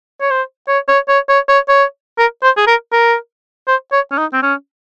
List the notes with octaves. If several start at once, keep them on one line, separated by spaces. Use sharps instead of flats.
C#5
C5
C#5
C#5
C#5
C#5
C#5
C#5
A#4
C5
G#4
A#4
A#4
C5
C#5
C#4
D#4
C4
C#4